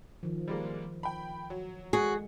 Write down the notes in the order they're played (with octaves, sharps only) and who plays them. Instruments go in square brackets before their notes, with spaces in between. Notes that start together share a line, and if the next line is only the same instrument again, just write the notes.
[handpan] D#3 F3
[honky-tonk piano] G3 G#3 A#3
G5 B5
F#3
[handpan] G#3 [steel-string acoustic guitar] F#4 [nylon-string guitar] G#4